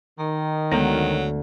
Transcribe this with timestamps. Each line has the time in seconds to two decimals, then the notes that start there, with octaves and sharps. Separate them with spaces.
0.18 D#3
0.72 D2 F#3 G#3 B3